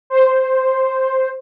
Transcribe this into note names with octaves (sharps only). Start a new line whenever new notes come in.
C5